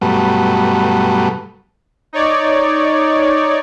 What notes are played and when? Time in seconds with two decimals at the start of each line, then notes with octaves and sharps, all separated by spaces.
0.01 G2 B2 F#3 A3
2.13 D#4 C#5 D5